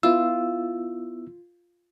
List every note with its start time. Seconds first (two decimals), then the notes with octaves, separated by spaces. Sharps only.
0.03 B3 E4 F4 E6